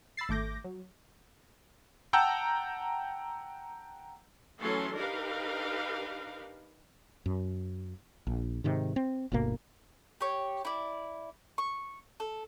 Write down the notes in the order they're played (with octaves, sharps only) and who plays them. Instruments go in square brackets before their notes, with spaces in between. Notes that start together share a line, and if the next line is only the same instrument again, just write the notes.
[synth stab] B5 E6 A6 C7
G#1 A3 D6 G6 A#6
F#3
[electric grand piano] F#5 G5 A5 A#5 E6 G6
[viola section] E3 F#3 A3 C#4 A4 C6
D4 D#4 G4 A#4 B4 F5
[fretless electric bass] F#2
A#1
G#2 C3 D#3
C4
G1 D2 B2 A#3
[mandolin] G4 C#5
E4 D5
C#6
A4